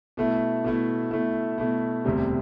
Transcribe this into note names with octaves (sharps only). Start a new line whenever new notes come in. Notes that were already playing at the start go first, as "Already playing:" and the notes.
B2 A3 E4
B2 A3 E4
B2 A3 E4
B2 A3 E4
E1 D2 C3 G3